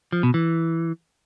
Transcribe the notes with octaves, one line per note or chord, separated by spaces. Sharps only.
F3
B2
E3